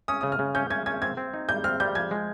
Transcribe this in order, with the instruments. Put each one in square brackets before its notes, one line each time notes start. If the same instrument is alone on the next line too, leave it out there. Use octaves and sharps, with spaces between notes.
[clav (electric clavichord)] C#4 [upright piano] D#6
[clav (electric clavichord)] C#3 [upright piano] D#6
[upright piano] F6
[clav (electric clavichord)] C#3
[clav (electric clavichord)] C#4 [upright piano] G6
[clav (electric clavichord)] C#4 [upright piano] G#6
[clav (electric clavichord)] C#4 [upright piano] G#6
[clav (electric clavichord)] C4 [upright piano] G#6
[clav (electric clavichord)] C4
D#4
[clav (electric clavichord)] G3 [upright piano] G6
[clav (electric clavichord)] C4 [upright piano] F6
[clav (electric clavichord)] G3 [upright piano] G6
[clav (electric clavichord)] F3 [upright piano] G#6
[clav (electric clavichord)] G#3